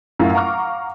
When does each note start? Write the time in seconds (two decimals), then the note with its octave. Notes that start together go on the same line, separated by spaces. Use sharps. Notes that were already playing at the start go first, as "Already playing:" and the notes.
0.19 F#2 A2 F#3 A#3 E4 F4
0.33 F5 F#5 A#5 C#6 D6 F6